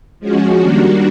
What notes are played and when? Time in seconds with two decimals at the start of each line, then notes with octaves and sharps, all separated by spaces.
0.19 F3 G#3 C#4 F#4
0.59 D#3 G3 A#3 D4 F#4